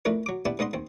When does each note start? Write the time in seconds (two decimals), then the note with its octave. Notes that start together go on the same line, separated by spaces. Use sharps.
0.05 F2 A3 D4 E4 A#4 B4
0.26 F#3 D6
0.45 B3 D4 E4 G4 D5 A5
0.59 G#2 B3 D4 D#5 C6
0.73 D#2 C4